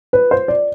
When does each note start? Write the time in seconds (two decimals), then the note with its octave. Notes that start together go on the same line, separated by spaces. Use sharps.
0.13 B4
0.31 C5
0.48 D5